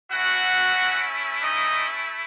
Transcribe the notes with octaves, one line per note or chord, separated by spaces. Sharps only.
A3 C#4 E4 F#4 F#5
D#4 D#5